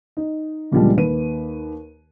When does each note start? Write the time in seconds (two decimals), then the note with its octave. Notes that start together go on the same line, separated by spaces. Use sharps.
0.17 D#4
0.72 D2 A#2 C#3 F3 G3 G#3
0.97 D#2 B4 D#7